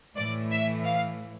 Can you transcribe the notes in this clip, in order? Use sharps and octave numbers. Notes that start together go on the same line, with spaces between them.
A2 E3 D5
E5
F5